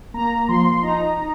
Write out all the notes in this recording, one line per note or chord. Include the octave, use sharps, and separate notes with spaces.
A#3 A#5
F3 C6
D#4 A#5
D#4